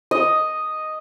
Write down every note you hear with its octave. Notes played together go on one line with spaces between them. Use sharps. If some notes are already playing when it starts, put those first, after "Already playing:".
D#5